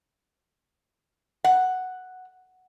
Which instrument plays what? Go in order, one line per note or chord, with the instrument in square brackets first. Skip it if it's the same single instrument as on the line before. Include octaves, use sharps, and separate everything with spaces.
[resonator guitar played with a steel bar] F#5